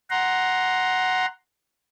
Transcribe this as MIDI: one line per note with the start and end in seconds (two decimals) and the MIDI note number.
0.10 1.26 78
0.10 1.26 82
0.10 1.26 84